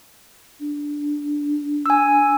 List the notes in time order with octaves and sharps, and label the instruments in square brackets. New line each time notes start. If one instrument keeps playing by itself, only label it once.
[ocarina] D4
[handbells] G#5 E6